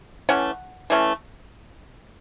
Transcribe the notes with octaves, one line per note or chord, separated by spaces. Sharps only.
E3 A3 C#4 F#5
E3 A3 C#4